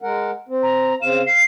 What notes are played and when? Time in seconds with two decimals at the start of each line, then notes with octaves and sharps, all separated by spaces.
0.02 G#3 A#4 F#5
0.48 C4
0.63 A#5
1.02 C#3 C4 F5 E7
1.27 F5 C7